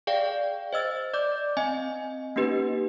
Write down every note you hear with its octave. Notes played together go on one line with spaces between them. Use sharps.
G#4 D5 F5 G5
C5 D#5 E6 A6
D5 D6 G6
C4 D#5 G#5
A#3 C#4 D#4 G4 B4